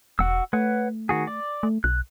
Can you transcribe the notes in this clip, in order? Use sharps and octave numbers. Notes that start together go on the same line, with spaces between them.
E1 F#4 F#5 E6
A3 B4 C#5 F#5
D#3 F#4 G#4
D5
A3
B1 F#6